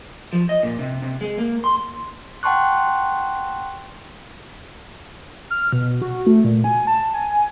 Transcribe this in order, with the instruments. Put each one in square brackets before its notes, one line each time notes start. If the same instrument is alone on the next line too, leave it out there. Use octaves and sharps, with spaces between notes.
[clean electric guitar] F3
D#5
A#2
C3
C3
G#3
A#3
C6
[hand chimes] F#5 G5 A5 C6 C#6 F#6
[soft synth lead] F6
B2
F#4
A3
A#2
G#5
A5
G#5